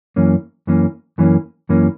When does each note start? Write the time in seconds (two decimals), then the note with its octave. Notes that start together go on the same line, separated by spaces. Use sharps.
0.16 F#2 E3 A#3 C#4
0.67 F#2 E3 A#3 C#4
1.18 F#2 E3 A#3 C#4
1.69 F#2 E3 A#3 C#4